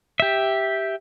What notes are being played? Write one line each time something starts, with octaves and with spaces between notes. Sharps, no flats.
G4 E5